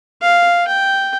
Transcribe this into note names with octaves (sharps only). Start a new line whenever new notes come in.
F5
G5